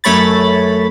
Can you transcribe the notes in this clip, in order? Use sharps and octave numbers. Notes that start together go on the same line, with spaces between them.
F#2 A3 C#5 B5 A6